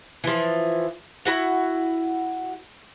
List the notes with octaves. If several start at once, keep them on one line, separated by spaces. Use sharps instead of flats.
E3 F3
E4 F#4 F#5